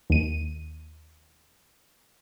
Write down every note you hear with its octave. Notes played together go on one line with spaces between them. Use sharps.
D#2 D#7